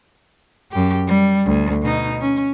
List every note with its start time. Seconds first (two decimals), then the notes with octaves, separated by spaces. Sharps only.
0.72 F#2 G4
1.08 G3
1.46 D2
1.83 B2 D#4
2.21 C#4